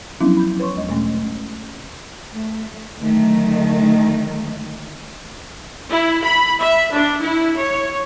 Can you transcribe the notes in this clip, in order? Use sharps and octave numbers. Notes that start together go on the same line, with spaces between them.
F3 F#3 B3 C#4 D4 E4
B5 G6
B4 C#5 C6 C#6
E2 G#3 D#5
B2 G#3 A3 C#4
A3
D3 D#3 F#3 A3
E4
B5
E5
D4
E4
C#5